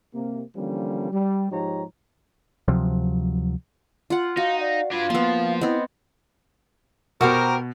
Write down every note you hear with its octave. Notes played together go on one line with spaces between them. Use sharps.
C3 A#3
D3 E3 F3 G3 A#3 C#4
G3
G#2 F3 D#4 G4 C#5 A#5
D2 C3 F3 F#3
F4 F#5
D#4 F#4 F5
D5 F5
D4 F4 B4 G#6
F3 A#3 B3 C6
B3 C4 E4 D#5
B2 F#4 G4 A#4 C5